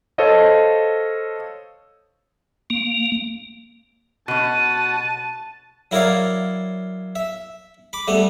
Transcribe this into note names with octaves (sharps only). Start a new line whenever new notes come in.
A4 C5 C#5 D#5 F5
A#3
B2 C#4 F#4 A5 D#7
F#3 E4 A#4 C#5 D5 F5
E5
B5 D6
G3 A3 B3